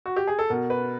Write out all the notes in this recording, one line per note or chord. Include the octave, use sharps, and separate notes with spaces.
F#4
G4
G#4
A4
B2 A#4
B4